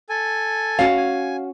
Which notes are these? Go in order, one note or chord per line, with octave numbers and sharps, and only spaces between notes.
A4 G#5
C#4 F#4 F5
G#5